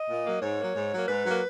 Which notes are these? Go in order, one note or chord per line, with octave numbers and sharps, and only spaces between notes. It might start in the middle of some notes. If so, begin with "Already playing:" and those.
Already playing: D#5
A#2
F#3 A#3
G#2 C#5
F#3 A#3
G#2
F#3 A#3
G#2 B4
F#3 A#3